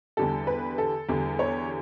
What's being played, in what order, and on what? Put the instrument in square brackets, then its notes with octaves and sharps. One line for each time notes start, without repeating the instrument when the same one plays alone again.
[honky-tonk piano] E2 D3 G3 A4
B4
A4
E2 D3 G3
C#5